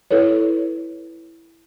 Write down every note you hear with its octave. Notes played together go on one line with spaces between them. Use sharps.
E4 A4 B4 C#5